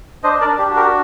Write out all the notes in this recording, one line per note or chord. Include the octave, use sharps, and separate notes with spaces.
D4 C5 D#5
A#4 D5
D4
G4
F#4
G4 A#4